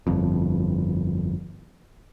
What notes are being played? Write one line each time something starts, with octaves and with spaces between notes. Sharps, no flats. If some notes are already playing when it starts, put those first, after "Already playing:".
G1 F2